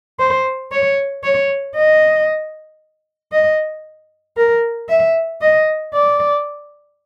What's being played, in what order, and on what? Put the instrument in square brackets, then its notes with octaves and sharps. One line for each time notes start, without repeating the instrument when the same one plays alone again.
[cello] C5
C#5
C#5
D#5
D#5
A#4
E5
D#5
D5